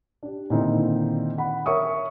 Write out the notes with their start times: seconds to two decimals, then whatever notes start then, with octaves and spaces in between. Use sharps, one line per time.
0.23 D4 G4
0.50 A#2 D3 D#3 C4 D#4 E4
1.38 F#5 B5
1.66 A#4 C#5 E5 C#6 D#6